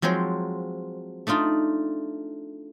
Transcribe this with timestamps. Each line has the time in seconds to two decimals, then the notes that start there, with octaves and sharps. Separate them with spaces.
0.02 F3 F#3 G#3 C4 C5
1.27 A3 D4 D#4 F4